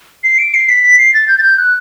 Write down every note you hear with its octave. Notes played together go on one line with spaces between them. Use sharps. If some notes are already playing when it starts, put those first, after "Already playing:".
C7
D7
C7
B6
B6
C7
A6
G6
A6
G6
F#6